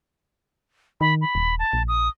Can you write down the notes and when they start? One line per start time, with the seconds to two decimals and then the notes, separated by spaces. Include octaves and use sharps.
1.01 D#3 B5
1.21 B5
1.35 D#1
1.59 A5
1.73 A#1
1.88 D#6